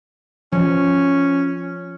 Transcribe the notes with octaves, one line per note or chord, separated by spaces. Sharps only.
F3 C#4